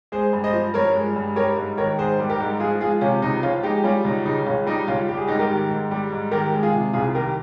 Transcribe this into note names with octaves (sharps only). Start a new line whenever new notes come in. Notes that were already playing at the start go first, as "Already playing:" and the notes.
G#3 G#4 C5
G2
C5 D#5
F3
G2 A#4 C#5
G#3
G2
G3 A#4 C#5
G#2
D#3 A#4 C#5
G#2 G#4 C5
G3
G4 A#4
G#2
F3 F4 G#4
G#3 F4 G#4
C3 C#4 F4
C#2 D#4
F3 C#4 F4
G#3 D#4 G4
G3 C#4 F4
C#2 D#4
C#3 D#4
C#2 C#4 F4
G3 D#4
C#2 C#4 F4
G3 G4
G#4
G#2 D#4 G4
G4 A#4
D#3
G#2
G3
G#2
D#3 G4 A#4
G#3
F4 G#4
C3
C2 F4 G#4
D#3 G4 A#4